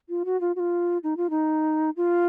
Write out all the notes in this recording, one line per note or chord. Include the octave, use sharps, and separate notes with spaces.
F4
F#4
F4
F#4
F4
D#4
F4
D#4
F4